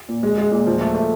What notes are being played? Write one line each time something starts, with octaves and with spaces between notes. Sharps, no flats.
A#2
G#3
G#3
A#2
F3
A3
A3